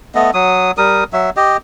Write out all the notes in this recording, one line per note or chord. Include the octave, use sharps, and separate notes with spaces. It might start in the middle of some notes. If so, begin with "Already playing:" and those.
A3 B3 D#5
F#3 D#6
G3 A#4 D#6
F#3 E5
G4 D#5